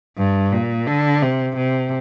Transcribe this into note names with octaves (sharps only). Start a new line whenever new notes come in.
G2
A#2
D3
C3
C3